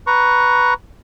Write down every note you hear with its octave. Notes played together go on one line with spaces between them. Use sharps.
B4 A#5 C#6